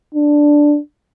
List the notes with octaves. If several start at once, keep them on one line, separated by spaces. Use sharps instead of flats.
D4